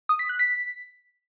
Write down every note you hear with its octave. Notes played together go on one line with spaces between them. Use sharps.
D#6
B6
F#6
B6